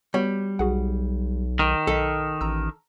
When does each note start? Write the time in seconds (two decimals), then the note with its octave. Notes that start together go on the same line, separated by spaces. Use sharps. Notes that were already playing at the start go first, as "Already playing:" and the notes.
0.14 G3 B3 F#4 C#5
0.59 B1 F#4 G#4 F#5
1.59 D#3
1.87 B1 A4 D#5 B6
2.41 A1 A#5 E6